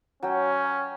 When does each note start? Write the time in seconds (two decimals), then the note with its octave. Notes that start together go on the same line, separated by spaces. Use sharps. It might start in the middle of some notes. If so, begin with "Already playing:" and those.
0.23 F#3 C#4 G5